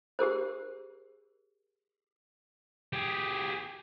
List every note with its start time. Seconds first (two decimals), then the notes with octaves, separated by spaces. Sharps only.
0.19 G4 G#4 A#4 C5
2.93 G4 G#4